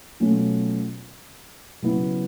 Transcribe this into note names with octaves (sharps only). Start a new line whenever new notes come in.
B2 F#3 A3 C#4 F4
C#3 F#3 B3 E4